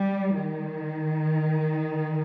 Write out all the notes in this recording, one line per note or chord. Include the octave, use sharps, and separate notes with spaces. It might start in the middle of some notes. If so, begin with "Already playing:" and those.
Already playing: G3
D#3